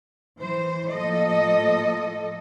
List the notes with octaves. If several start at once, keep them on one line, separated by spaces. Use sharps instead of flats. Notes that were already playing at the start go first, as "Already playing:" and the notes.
E3 C5
A2 F3 A#3 A4 D#5